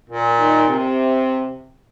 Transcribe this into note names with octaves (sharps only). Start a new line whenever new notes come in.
A#2
D#3
C3